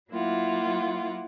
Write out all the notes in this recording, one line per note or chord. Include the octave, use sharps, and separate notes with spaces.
F#3 A#3 E4 F4 F#5